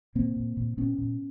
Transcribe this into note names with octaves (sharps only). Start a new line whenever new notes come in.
A#2 A#3 C4
A#2
A#2
A#2 B3 C#4
A#2